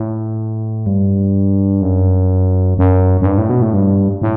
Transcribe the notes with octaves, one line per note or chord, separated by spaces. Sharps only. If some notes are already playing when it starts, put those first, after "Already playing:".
Already playing: A2
G2
F#2
F#2
F#2
G2
A2
B2
A2
G2
A2